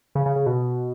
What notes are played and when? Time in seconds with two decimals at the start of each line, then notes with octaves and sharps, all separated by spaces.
0.15 C#3
0.26 C#3
0.36 C#3
0.46 B2